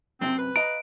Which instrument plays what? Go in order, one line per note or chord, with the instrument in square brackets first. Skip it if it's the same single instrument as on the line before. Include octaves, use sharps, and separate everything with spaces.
[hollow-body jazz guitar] F#2 A2 C3 [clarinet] C4
[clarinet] B4
[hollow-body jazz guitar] D#5 F5 A#5 [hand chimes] D7